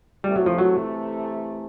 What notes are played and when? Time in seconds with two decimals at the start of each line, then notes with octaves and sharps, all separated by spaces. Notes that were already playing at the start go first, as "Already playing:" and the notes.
0.24 C3 E3 G3 A3
0.36 F#3
0.46 F3
0.58 F#3